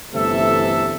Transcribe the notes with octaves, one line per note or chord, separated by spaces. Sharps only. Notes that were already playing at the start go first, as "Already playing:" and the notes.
G1 C3 E3 A3 A4 E5